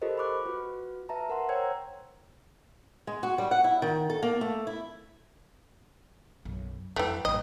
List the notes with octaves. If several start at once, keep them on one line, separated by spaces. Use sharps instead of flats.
F4 G4 A4 A#4 C5 D#5
B5 C#6 D6 F#6
F4 F#4 B4
B4 E5 A5 A#5
A#4 F#5 C6
C5 C#5 G5 A#5 E6 G#6
G#3
F#4
G3
F#5
E4
D#3
A4
A#3
A3
E4
B1 F#2
F2 E3 F#3 A3 B4 G5
A1 E3 D#5